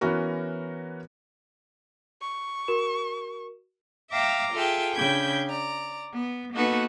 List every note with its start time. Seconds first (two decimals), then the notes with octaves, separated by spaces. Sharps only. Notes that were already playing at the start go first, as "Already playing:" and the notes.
0.01 E3 B3 C#4 F#4 A#4
2.22 C#6
2.68 F#4 A#4 E7
4.11 E5 F5 G5 A#5 D6
4.55 F4 G#4 A4 E5 G5
4.94 C#3 D4 G5 B5 G6 G#6
5.48 D5 A#5
6.14 B3
6.54 A#3 B3 D#4 F#4 A4 B4